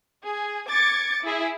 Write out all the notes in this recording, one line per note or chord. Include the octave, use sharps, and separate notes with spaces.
G#4
D6 G#6 A6 C#7
E4 G#4